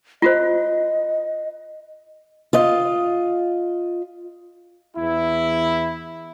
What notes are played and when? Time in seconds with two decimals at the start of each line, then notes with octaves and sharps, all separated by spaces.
0.22 F4 F#4 C5 D#5
2.53 F4 D#5
4.97 E2 E4